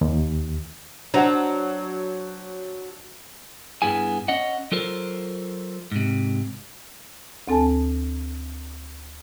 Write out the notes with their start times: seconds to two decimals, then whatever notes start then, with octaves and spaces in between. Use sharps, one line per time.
0.01 D#2
1.14 F#3 D4 C5 F#5
3.82 G2 B3 E4 G#4 G#5
4.28 C#4 D#5 F#5
4.72 F#3 F4 A4 A#4 C5
5.92 G#2 C3
7.48 D2 C4 A4 G#5 A5